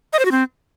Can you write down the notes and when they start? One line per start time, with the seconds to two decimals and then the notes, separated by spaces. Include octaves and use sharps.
0.13 D#5
0.19 C5
0.25 F#4
0.31 C4